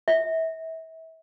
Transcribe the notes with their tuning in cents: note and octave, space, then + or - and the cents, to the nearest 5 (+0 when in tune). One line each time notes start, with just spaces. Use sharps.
E5 -30